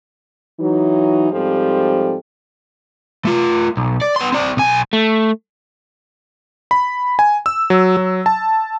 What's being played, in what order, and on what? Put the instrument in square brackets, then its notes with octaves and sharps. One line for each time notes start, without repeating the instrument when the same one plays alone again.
[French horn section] E3 F#3 D#4
G#2 F3 G3 C4 G4 A4
[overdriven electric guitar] A3 F4
B1
D5
B3 C6
C4 D5
B1 G#5
[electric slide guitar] A3
[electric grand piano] B5
G#5
E6
F#3
F#3
A5